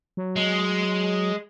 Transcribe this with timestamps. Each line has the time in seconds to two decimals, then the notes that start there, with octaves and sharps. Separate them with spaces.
0.17 F#3
0.36 G#3